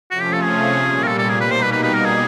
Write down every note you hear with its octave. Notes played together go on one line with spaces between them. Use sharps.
C3 F3 A3 C#4 F4 F#4
G4
A4
G#4
A#2 G3 A#3
A#4
A4
A4
G#4
B2 G3 A#3 D#4 B4
C5
B4
B4
B4
A#4
G#4